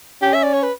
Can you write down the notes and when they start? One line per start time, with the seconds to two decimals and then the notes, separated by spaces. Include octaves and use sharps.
0.22 C#4 G4
0.34 E5
0.43 D5
0.54 C#5
0.63 B4